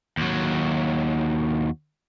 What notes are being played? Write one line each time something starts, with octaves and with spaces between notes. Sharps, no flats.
D#2 F#3